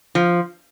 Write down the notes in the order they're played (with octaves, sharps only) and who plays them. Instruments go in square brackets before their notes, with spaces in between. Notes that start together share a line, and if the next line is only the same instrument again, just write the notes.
[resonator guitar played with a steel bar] F3